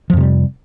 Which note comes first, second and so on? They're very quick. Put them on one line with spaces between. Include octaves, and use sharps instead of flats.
F3 F2 C3 G3